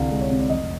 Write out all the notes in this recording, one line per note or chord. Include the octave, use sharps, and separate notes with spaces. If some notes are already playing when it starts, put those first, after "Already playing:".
Already playing: C2 D3 F5
G#3
C#5
C3
D5
F1 D#5